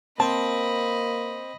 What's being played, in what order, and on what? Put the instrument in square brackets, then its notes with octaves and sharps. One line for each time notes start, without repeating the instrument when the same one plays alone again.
[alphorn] A#3 [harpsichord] C4 [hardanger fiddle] D#5 B5 [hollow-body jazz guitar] A5